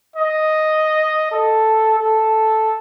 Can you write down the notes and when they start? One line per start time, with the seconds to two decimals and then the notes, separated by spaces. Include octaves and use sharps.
0.16 D#5
1.32 A4
1.99 A4